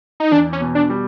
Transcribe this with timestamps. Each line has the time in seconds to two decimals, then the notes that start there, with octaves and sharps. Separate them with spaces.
0.20 D#4
0.31 E2 D4
0.53 C#4
0.60 B2
0.75 D4
0.90 G3